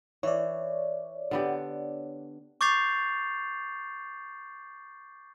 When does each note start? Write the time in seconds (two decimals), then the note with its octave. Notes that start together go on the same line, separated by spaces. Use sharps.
0.23 E3 C#5 D5
1.31 D3 B3 G4
2.61 C#6 D6 G6 A6 C7 F7